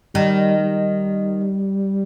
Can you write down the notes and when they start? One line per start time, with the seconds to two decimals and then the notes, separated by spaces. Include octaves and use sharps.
0.15 D#3 G3
0.60 G3